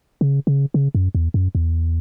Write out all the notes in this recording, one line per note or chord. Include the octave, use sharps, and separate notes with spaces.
C#3
C#3
C#3
F#2
E2
F#2
E2